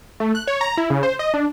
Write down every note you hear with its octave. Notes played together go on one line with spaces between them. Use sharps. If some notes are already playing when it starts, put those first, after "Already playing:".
A3
F#6
C#5
A#5
E4
C#3
C5
D#5
D4